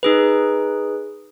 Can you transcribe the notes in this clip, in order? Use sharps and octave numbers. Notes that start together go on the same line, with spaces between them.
D#4 G#4 B4